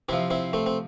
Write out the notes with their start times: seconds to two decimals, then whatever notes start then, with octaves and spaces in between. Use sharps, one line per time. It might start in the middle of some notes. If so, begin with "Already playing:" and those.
0.09 C3 F3 C4 E4
0.30 C4 E4
0.53 A3 C4
0.66 C4